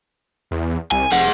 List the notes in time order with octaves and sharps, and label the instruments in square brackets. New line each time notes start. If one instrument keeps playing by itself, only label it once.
[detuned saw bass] E2
[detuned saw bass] C2 [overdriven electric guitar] G#5
[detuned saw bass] F1 [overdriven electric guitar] G#4 F#5